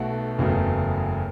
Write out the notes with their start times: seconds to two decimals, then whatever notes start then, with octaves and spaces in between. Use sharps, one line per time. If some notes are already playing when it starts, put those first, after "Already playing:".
Already playing: B1 B2 A3 F#5
0.38 F#1 E2 C#3 F#3 A3